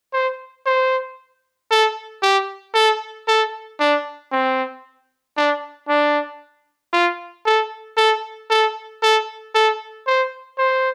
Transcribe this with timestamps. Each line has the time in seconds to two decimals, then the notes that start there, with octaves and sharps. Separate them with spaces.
0.13 C5
0.66 C5
1.71 A4
2.22 G4
2.74 A4
3.28 A4
3.80 D4
4.32 C4
5.37 D4
5.88 D4
6.93 F4
7.46 A4
7.97 A4
8.50 A4
9.02 A4
9.55 A4
10.07 C5
10.58 C5